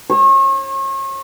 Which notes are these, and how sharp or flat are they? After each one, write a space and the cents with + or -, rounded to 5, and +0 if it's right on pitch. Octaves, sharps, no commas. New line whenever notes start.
C#5 -40